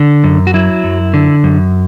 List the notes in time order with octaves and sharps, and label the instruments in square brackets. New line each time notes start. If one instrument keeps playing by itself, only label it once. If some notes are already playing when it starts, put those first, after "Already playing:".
Already playing: [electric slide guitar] D3
F#2
F#4
F#3 E4
F#2
D3
F#2